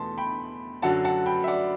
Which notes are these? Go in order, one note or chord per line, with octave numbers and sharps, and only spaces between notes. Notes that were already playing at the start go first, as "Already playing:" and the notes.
Already playing: E2 B2 A3 A5 C6
G5 B5
F#2 D3 F#3 F#5 A5
F#5 A5
G5 B5
E5
D5 F#5